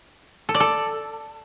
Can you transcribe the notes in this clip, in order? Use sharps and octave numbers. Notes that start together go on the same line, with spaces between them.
A4
D5
A4